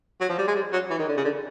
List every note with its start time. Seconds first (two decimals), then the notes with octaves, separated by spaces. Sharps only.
0.21 F#3
0.29 F3
0.38 G3
0.47 G#3
0.55 G3
0.73 F#3
0.90 E3
0.99 D#3
1.08 D3
1.17 C#3
1.25 D3